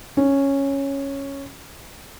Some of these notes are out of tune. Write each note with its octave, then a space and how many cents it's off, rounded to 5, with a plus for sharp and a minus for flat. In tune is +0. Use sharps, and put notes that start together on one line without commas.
C#4 -5